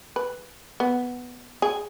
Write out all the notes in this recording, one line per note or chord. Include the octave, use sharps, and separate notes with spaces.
B4
B3
G#4